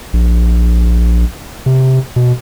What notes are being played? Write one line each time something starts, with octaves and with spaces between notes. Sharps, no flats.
A#1
C3
B2